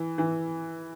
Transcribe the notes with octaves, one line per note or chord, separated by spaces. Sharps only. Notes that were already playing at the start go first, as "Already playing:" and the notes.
Already playing: E3
E3